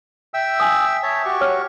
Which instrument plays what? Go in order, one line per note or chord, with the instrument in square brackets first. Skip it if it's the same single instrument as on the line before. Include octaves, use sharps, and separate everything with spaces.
[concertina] E5 G5 E6
[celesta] G#5 D#6
[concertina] C#5 E5 A5
F#4 G4 C#6
[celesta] C#5 F6